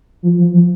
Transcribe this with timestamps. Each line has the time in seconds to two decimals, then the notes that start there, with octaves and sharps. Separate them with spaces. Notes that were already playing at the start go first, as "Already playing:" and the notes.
0.23 F3
0.38 F3
0.54 F3